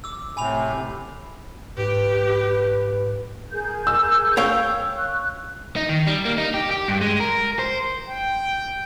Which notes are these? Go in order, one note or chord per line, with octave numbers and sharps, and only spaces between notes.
D6 E6
A2 C3 G#5 B5 F7
G#2 G4 B4
G#4 A#4 G6
E6
C#5 F5 G5
C#6 F#6
D#4
D#3
G3
A#3
D#4
G4
G4
G2
G#3
A#4
C5
G5